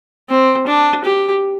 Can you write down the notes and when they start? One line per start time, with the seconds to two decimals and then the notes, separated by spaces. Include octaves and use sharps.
0.29 C4
0.67 D4
1.05 G4